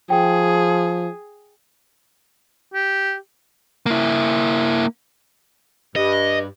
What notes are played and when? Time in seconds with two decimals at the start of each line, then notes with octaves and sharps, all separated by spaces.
0.10 F3 G#4 G5
2.74 G4
3.86 A#3 E4
5.96 G2 D#5